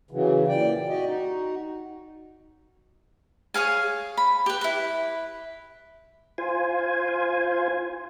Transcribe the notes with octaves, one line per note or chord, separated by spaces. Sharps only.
C#3 E3 F#3
A#2 E3 D5 G5
F#4 G4 D5 D#5
D#4 F#4
G#4 C#5 F5 G#5
B5
G4 B4
E4 B4
F4 C5 G#5